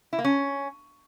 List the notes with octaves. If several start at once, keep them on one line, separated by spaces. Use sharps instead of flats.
E4
A#3
C#4